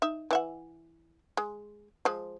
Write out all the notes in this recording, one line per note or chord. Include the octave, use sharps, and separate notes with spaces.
D#4 E5
E3 E5 F#5
G#3
F3 G#3